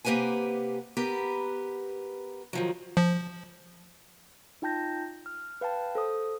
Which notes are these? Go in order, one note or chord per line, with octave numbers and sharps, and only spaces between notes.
C3 A#3 G4 B4 F#5 G#5
B3 G4 A#4 B4
D#3 F3 F#3
F3
D#4 F4 G5 A5 G6 A#6
F6
B4 F5 G5 A5
A4 C5 D#6